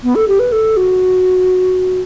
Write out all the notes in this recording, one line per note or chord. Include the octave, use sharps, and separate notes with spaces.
B3
A4
G4
B4
A4
F#4